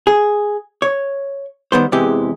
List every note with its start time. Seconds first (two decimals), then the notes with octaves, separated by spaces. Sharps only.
0.07 G#4
0.82 C#5
1.72 D#3 G3 B3 C5
1.92 E2 C3 E3 G#3 G4